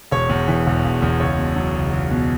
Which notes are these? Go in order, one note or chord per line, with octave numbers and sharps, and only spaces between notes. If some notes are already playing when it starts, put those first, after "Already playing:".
E1 C#5
E2
E3
E1
E1
E2
C#2 C#5
B2
F#3
C#2
C#2
B2